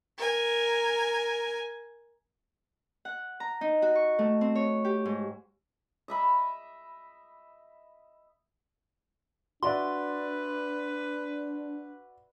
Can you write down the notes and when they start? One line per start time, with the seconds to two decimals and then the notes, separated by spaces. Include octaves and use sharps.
0.18 A#4 G#5
3.05 F#5
3.40 A#5
3.61 D#4
3.82 F#4
3.95 C#6
4.19 A3
4.41 C4
4.55 C#5
4.85 G4
5.05 G#2
6.08 D#5 E5 B5
9.63 D4 F#4 B4 D5 E5 C6